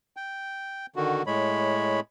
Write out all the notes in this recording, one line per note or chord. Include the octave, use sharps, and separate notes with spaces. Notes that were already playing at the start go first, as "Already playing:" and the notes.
G5
D3 D#3 F#4
A2 G#3 C#5 B5